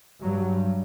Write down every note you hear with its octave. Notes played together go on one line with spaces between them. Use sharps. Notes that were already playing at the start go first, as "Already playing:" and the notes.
G2 F#3